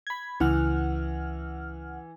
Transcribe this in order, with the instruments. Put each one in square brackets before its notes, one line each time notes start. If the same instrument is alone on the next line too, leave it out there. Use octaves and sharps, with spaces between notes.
[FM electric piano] B5 G#6
[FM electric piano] C#2 F#5 F6 [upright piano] E3